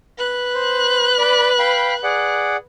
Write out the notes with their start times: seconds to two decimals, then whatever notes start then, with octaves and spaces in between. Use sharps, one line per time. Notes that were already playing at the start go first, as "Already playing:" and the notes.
0.17 B4 F#6
0.55 C5
1.18 D5 B5
1.59 F5 G5 B5
2.03 G#4 D5 F#5